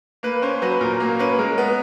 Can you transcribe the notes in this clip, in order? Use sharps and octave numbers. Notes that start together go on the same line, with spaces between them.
A#3 B4
C#4 C5
F#3 B4
A#2 A#4
A#3
C#4 B4
G#3 A#4
B3